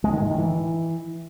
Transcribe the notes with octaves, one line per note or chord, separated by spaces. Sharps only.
G#3
D#3
A2
D#3
E3